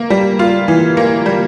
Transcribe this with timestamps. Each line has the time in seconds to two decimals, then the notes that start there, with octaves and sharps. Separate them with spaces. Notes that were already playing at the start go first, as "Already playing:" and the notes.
Already playing: A#3
0.10 G3
0.39 F4
0.68 E3
0.97 A#3
1.26 G3